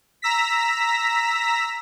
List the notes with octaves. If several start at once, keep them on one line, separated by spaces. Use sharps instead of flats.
A#5 E6 A#6 B6